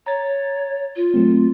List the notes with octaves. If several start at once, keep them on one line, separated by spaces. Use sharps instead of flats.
C#5 A#5 A6
F4
F#3 A3 C4